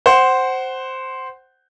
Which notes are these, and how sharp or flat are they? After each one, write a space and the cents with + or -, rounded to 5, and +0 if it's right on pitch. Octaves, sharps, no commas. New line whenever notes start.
C5 +0 F#5 +20